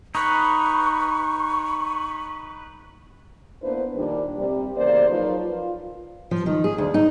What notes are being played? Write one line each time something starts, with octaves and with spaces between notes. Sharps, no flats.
D#4 B4 C#6
A#3 B3 D4 E4 B4 C5
A#2 D#3 F3 G3 D4
C3 G3
E2 C#3 A#3 C5 D5
F3 F#3 D#4 F4 A#4 B4
F4
F3
D#3
G#4
D2
D#4